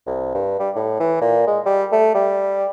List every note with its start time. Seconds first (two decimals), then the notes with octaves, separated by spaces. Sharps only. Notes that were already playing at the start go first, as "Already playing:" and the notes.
0.07 C2
0.35 G2
0.60 G3
0.76 A2
1.00 E3
1.21 A#2
1.47 G#3
1.66 G3
1.92 A3
2.14 G3